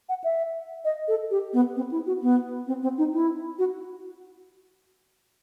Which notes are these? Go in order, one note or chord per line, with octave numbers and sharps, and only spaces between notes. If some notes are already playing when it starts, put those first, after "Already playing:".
F#5
E5
D#5
A4
G4
B3
C4
E4
F#4
B3
C4
C4
D#4
E4
F#4